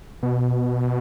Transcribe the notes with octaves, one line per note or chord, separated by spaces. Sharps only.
B2